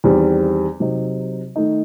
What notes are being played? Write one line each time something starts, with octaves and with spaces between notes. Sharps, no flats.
E2 D#3 G3 C4
C3 F#3 C4 D#4
D#3 A3 D#4